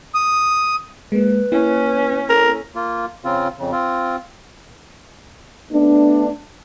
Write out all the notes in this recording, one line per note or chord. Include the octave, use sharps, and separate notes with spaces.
D#6
G#3 A#3 B4
A#3 C#4 E4
A4 A#4
A#3 F4
C#3 C4 F4
F2 C#3
C4 F4
A3 B3 D4